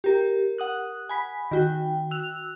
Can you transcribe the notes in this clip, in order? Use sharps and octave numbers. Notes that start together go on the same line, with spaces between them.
G4 A#4
F#5 D#6 F#6
G#5 B5 B6
D#3 F#4 G5
E6 F#6 F7